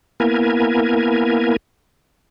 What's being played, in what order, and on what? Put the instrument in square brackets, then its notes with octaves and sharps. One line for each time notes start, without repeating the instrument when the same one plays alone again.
[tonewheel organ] A#3 B3 E4 A#4 G#5